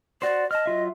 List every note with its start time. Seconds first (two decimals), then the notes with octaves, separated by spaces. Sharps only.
0.22 F#4 C5 D5
0.51 D#5 A5 F6
0.66 F#3 F4 E5